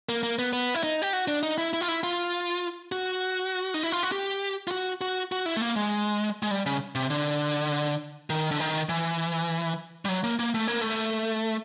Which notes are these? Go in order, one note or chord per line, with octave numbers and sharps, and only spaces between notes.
A#3
A#3
B3
B3
E4
D#4
G4
F#4
D4
D#4
E4
E4
F4
E4
F4
F#4
D#4
E4
F4
F#4
G4
F4
F#4
F#4
F#4
E4
A3
A#3
G#3
G#3
G3
C#3
C3
D3
D#3
D3
D#3
E3
G3
F#3
A#3
A#3
A3
A#3
A3